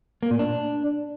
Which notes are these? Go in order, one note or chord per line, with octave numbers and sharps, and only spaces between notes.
A#3
A#2
D4